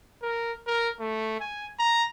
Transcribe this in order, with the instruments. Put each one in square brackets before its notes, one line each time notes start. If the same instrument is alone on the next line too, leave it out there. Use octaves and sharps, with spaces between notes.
[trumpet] A#4
A#4
A3
G#5
A#5